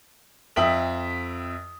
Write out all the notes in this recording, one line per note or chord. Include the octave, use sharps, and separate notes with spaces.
F2 E5 G5 D#6 B6 F#7